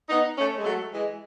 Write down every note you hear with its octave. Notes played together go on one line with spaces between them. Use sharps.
B3 D#4
A3 C#4
G#3
F#3 A3
E3 G#3